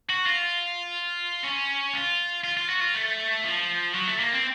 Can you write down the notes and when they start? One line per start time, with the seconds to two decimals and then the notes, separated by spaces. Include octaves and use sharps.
0.09 F#4
0.26 F4
1.44 C#4
1.94 F4
2.44 F4
2.57 F4
2.69 F#4
2.81 F4
2.95 A3
3.45 F3
3.94 F#3
4.07 A3
4.20 A#3
4.32 C4